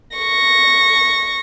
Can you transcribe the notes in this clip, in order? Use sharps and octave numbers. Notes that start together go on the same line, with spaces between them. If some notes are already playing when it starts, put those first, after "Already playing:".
C#6 A#6